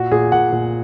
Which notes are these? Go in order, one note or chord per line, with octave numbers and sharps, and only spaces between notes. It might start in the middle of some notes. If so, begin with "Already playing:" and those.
Already playing: A#2 F#4
A#2 G#4
A#2 F#5
A#2